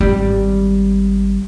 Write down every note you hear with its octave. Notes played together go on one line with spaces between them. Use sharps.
G#1 G3